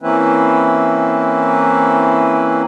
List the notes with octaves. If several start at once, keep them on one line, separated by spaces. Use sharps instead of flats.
E3 A#3 C4 C#4 E4 B4